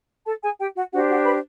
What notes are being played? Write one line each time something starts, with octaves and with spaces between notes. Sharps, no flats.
A4 A5
G#4 G#5
G4 G5
F#4 F#5
D4 F#4 G4 C5 F#5
F#4 F#5
B4 B5